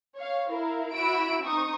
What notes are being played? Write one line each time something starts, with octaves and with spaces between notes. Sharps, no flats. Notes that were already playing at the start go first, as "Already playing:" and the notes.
C#5 F5
E4 A#4 F5
E4 F#4 B5 E6 D7
C4 D#4 C#6 D#6